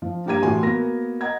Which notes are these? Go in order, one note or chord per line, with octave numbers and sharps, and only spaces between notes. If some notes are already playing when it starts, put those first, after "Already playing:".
F3
G2 A#3 G4 A#5 G#6 D#7
A2 C3 E3 F#4 G#5 C6
A#3 B3 F#4 A#4 A#6
D#5 F#5 A#5 G#6